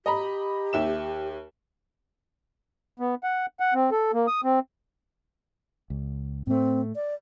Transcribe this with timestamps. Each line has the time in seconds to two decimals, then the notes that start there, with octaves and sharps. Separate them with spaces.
0.06 G4 D#5 A#5 B5
0.73 D#2 E5 E7
3.00 B3
3.23 F#5
3.60 F#5
3.74 C4
3.91 A4
4.14 A#3
4.27 D#6
4.44 C4
5.90 C#2
6.47 A2 A3 C4
6.95 D5